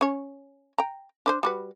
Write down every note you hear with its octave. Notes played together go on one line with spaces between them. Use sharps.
C#4 C#5
G5 A#5
D4 B4 C5
G3 F#4 B4